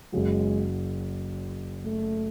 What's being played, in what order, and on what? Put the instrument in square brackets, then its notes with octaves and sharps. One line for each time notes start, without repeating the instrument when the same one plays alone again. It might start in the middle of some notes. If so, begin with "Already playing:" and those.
[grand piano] F#1 F#2 C#3 F#3 [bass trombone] G#3
[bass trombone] A3